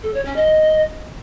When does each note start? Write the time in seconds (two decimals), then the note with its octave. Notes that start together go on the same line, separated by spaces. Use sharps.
0.03 A4
0.14 C#5
0.25 C#4
0.36 D#5